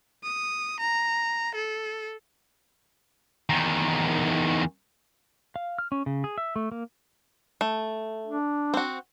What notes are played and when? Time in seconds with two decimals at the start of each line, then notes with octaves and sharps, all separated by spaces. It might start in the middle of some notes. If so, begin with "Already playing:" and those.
0.23 D#6
0.80 A#5
1.55 A4
3.50 E2 D#3
5.56 F5
5.78 F6
5.92 C#4
6.06 C#3
6.24 G#4
6.38 E5
6.56 A3
6.72 A#3
7.61 A3
8.27 D4
8.74 C4 F#4